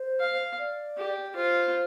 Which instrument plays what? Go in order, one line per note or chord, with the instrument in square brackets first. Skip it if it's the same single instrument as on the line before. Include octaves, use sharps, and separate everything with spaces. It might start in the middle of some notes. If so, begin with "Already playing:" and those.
Already playing: [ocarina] C5
[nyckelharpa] F5
[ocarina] D5
[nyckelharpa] G4
[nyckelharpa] F4 [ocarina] C5